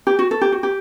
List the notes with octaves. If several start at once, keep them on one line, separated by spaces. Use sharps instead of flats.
G4
F#4
A4
G4
F#4
G4